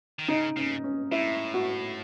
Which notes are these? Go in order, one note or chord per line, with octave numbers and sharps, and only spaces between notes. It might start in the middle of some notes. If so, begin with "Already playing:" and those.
D#3
C#3 D#4
C#3 C#4
C#4
A2 E4
F#4